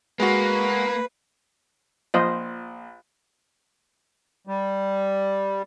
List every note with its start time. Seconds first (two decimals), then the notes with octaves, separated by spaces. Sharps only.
0.20 G#3 A#3 F#4 B4
2.14 A#1 F4 C5 D#5
4.47 G3